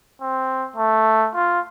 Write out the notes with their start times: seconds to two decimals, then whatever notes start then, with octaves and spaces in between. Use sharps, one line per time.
0.21 C4
0.76 A3
1.35 F4